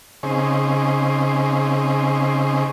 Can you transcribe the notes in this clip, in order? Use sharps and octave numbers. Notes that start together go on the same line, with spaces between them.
C#3 C4 D#4 G#4